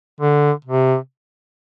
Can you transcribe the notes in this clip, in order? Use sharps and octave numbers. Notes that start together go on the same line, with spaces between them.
D3
C3